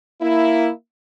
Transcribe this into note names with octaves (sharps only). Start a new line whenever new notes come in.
A#3 E4